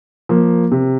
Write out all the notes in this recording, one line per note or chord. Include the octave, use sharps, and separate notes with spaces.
F3 A#3
C3